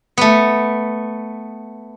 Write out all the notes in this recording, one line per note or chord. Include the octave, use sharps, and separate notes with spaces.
A3 B3